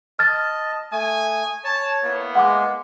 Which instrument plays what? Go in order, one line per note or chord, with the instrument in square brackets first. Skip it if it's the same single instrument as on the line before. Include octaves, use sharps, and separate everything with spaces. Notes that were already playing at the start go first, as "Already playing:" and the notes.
[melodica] D#5 A5 [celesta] F6 A6
[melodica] A3 D#6 [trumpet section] G#5
[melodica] C#5 [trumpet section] A5
[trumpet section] A#3 B3 E4
[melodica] G#3 [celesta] F#5 D6